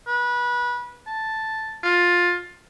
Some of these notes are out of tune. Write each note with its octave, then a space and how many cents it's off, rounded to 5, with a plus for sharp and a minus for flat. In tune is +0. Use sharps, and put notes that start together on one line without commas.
B4 -25
A5 +0
F4 +15